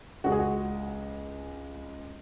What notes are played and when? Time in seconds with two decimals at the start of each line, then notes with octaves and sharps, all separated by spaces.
0.24 C#2 C#3 G#3 F#4
0.32 G#4
0.39 F#4